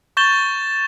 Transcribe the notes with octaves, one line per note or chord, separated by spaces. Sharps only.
C#6 G6 A6 E7 G7